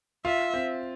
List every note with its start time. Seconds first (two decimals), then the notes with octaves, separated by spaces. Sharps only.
0.25 F4 E5
0.54 C4